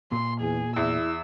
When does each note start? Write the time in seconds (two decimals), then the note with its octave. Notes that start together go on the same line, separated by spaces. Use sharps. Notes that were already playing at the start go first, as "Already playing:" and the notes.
0.12 A#2 C6
0.41 E2 G#4
0.76 E2 E4 E6